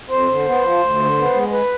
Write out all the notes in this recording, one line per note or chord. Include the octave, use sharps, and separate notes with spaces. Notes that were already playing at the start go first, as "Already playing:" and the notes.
F2 C5
D3
B3
F3
D2
D3
B3
G#3
B4